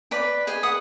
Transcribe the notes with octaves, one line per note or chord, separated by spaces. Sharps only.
B4 D5 B5
G#4 B4 D#5
F#5 D#6